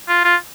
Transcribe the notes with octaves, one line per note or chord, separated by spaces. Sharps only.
F4
F4